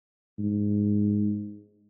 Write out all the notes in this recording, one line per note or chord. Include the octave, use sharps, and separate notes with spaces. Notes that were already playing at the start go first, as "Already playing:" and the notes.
G#2